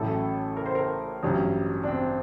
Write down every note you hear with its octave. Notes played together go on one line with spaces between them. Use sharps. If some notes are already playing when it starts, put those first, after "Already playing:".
Already playing: A1 A2 F#3 A4
A#4
C5
A#4
A1 G2 F#3
D4
C4